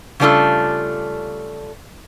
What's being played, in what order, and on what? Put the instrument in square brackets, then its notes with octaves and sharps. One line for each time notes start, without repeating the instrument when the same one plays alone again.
[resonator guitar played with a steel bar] C#3 G3 A3 D4 F4 A4